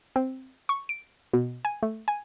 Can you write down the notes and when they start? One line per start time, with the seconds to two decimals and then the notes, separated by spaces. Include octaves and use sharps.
0.16 C4
0.69 C#6
0.89 D7
1.33 B2
1.65 G#5
1.83 A3
2.08 G#5